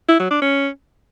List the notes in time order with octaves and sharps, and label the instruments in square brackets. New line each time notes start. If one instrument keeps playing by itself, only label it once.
[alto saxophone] E4
F#3
D4
C#4